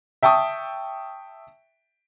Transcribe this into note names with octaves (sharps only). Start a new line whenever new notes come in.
E5 G5 A5 C#6 D#6